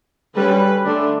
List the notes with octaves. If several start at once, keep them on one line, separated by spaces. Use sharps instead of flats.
D3 G3 C#4 B4
D3 A3 D4